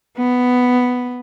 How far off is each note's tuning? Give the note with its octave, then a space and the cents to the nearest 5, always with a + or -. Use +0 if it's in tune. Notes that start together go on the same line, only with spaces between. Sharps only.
B3 +5